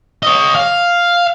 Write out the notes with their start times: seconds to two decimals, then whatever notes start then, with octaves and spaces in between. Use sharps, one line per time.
0.23 C#5 D#5
0.55 F5